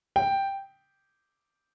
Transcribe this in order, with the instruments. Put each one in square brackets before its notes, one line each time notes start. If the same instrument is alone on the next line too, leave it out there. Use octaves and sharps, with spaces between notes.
[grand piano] G5